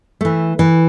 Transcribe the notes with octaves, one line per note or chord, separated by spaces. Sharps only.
E3 A3
E3